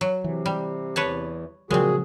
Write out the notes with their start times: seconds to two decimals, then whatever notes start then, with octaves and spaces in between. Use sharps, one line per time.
0.01 F#3
0.24 C3 E3
0.46 G3
0.96 E2 B4 C#5 A5
1.71 A#2 C#3 F3 F#3 G#3 C4 F#4 G#4